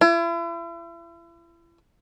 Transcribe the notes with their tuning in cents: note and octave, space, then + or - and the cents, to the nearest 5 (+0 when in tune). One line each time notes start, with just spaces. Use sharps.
E4 +40